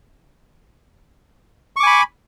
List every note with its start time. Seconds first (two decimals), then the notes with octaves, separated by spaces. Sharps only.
1.76 C#6
1.80 D6
1.83 G#5
1.87 B5